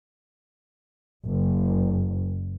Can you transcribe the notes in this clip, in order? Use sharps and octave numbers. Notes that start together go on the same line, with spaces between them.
F#1